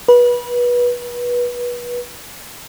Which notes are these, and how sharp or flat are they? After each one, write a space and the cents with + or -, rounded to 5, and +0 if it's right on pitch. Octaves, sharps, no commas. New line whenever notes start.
B4 -25